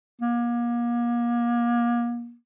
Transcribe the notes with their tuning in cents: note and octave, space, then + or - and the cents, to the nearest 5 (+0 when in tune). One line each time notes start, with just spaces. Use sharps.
A#3 +35